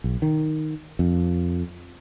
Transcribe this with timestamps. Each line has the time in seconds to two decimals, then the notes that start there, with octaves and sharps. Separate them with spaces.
0.04 B1
0.22 D#3
0.99 F2